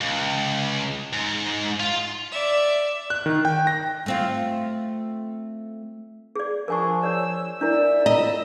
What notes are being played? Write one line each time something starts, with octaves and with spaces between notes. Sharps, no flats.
C#2
G#2
F4
D5 E5
F#6
D#3
G5
A#6
A3 C4 F4
G#4 D5
F3 D4 G#4 A#4 G#5 C#6
C#5 D5 E6
D4 E4 A#4 D5 E5 E6
F4 D#5 A#5